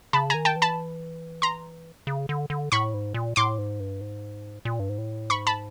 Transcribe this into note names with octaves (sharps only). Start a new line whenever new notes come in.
C#3 A5 B5
D#3 G#5 A#5
G5 A5
E3
A5 B5
A#5 C6
C#3
D3
D3
A2 B5 C#6
G#2
A#2
A2 C6 D6
G#2
G2
G#2
A#2
G2
G#2
A2
G#2 B5 C#6
A5 B5